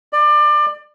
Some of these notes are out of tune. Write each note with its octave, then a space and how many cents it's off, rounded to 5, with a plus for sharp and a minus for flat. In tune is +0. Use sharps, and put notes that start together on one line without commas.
D5 +25